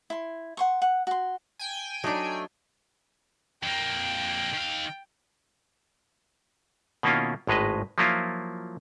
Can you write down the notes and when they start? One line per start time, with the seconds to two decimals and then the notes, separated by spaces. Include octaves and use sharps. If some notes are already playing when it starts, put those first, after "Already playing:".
0.10 E4 C6
0.57 F#5 C6 C#6
0.82 F#5
1.07 F#4 C6
1.60 G5 G#5
2.04 F#3 A3 D4 D#4
3.63 F2 A#3 G5
4.53 D#3 F5
7.03 B2 D#3 A#3 C#4 E4 F4
7.47 G#1 A2 G#3 B4 D#5
7.98 F3 F#3 A#3 E4 F4